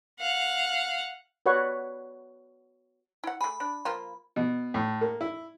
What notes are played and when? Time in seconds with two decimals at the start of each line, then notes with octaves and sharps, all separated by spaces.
0.19 F5 F#5
1.46 F#4 B4 C#5 D5 F#5 C#6
3.24 E4 F#5
3.41 A3 G#4 B5
3.60 D4
3.85 F3 A#3 F4
4.36 B2
4.74 A2
5.01 A#3
5.21 E4